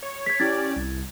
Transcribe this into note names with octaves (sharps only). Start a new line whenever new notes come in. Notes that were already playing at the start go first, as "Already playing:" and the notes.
C#5
G#6 B6
C#4 E4 G4 D5 G#6 A6
C2